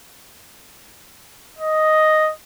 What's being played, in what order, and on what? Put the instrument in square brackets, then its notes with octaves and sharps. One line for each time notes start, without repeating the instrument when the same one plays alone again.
[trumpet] D#5